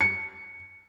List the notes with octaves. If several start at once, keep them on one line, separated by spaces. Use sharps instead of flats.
C#7